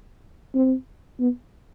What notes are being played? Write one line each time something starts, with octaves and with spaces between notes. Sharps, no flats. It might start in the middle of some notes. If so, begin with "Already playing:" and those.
C4
B3